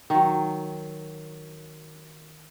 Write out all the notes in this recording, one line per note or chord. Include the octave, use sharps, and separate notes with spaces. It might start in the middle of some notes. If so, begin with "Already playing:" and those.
D#3 F#3